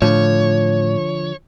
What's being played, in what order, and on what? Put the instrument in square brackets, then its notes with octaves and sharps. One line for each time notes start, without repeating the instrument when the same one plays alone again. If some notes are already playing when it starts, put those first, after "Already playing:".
[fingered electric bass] A2 [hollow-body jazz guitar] D3 F3 [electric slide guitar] C#5